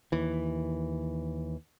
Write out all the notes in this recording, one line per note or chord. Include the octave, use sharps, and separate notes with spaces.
D#2 E3